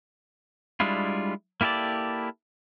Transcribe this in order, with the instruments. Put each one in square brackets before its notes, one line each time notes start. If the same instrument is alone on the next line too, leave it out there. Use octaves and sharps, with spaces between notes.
[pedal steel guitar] G3 G#3 D4 E4 F4
A#3 E4 G4 A4 D5